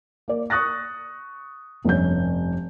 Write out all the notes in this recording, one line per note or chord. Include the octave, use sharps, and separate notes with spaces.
A#3 D5
C#6 D#6 F#6 A6 A#6
F1 G2 C#4 G6